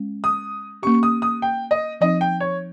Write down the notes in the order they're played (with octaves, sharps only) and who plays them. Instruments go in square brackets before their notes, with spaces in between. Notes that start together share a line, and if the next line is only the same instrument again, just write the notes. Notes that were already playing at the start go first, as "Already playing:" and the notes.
Already playing: [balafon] G#3 C#4
[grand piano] D#6
[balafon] A#3 C#4 G4 [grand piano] C#6
[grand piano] D#6
D#6
G5
D#5
[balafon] F3 C4 D#4 [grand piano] D#5
[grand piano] G5
C#5